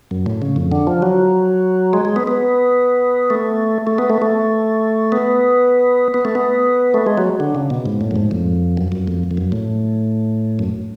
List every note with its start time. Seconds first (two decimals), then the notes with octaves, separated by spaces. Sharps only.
0.11 F#2
0.26 A2
0.42 C#3
0.56 F2
0.72 D3
0.87 F3
1.02 F#3
1.93 G#3
2.05 G#3
2.16 B3
2.27 B3
3.30 A3
3.87 A3
3.98 B3
4.10 A3
4.22 A3
5.12 B3
6.14 B3
6.25 A3
6.35 B3
6.94 A3
7.07 G#3
7.18 F#3
7.40 D3
7.55 C#3
7.70 B2
7.86 G#2
8.01 A2
8.11 F#2
8.16 G#2
8.31 F2
8.77 F#2
8.92 F#2
9.07 F2
9.31 F2
9.37 F#2
9.52 A2
10.59 F#2